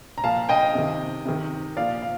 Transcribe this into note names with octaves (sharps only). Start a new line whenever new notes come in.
A#5
A#2 F3 F5 A5
D#5 G5
C3 D#3
C3 D#3
A#2 F3 D5 F5
F5